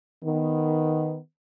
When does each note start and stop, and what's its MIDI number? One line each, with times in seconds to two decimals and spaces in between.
0.24 1.17 51
0.24 1.17 59